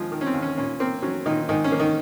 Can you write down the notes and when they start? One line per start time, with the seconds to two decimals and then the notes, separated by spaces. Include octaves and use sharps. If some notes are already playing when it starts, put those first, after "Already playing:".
Already playing: D#2 F3 G#3 F4
0.12 D#3
0.21 C#4
0.26 C4
0.34 D#2
0.42 C#4
0.58 A#2 C#4
0.80 A#3 C4
1.02 F#3 C#4
1.26 A#2 D#3 D#4
1.49 G#2 D#3 D#4
1.64 C#4
1.72 A#3
1.80 D#3 D#4